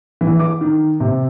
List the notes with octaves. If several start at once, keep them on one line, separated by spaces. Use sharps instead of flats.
E3
D6
D#3
C3